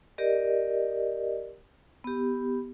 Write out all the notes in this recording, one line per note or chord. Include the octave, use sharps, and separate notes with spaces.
G4 A#4 D5 D#5
B3 G4